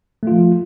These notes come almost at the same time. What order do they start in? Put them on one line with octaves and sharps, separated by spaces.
A3 F4 F3